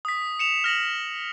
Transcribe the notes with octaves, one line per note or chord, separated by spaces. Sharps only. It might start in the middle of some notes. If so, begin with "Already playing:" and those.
D#6 B6
C#7 E7 F7
F6 A#6 F7 F#7